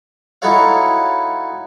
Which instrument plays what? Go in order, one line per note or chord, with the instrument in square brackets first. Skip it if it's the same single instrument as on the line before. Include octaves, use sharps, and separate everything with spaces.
[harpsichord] D#4 E4 F#4 A4 C#5 F5